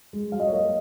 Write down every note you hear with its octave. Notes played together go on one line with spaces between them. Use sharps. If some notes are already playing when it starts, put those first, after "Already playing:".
G#3
F#3 F5
D#5
C#5
A#3 D#5